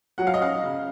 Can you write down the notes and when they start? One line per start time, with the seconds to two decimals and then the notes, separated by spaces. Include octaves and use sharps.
0.18 F#3 F#5
0.27 F5
0.34 D#5
0.40 C#4 F5
0.63 C#3